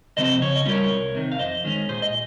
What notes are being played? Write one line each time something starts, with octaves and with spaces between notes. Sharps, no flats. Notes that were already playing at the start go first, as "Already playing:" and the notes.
C3 F3 C4 C5 D#5
C#3 C#5
D#5
G3 C#4 F4 A#4 C#5
C2
C3 D#3
F5
F2 C5 D#5
D#3 G#3 C#4
A#2 G#4 C5
D#5